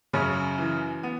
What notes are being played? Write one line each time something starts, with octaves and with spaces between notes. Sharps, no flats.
F#2 C#3 C#4
E3
B3